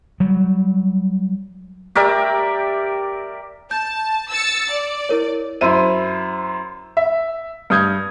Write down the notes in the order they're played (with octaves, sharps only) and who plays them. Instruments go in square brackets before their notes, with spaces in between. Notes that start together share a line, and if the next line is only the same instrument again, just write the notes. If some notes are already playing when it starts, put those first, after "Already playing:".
[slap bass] F#3 G3
[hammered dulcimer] G4 A#4 D5 E5
[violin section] A5 [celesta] G6
[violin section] E6 A6 C#7
D5
[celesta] E4 A#4 C#5
[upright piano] F#2 E4 C5 D#7
E5
G2 D#6 G6 G#6